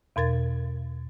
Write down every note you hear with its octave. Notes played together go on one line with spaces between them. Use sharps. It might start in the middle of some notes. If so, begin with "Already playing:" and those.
E2 B2 A#4 A6